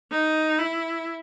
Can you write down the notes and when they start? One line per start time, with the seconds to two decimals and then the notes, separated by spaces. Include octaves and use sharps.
0.11 D#4
0.59 E4